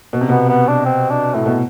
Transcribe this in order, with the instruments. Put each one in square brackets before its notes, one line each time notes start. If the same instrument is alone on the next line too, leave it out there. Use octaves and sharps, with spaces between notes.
[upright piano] B2
C3
[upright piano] B2 [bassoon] B3
[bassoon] B3
D4
C4
D4
[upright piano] A2 [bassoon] A3
[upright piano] B2